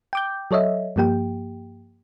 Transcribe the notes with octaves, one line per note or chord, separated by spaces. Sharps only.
G5 D6 G6
F#3 A4 C#5 D#5 E5
G2 F3 A#3 G4 G5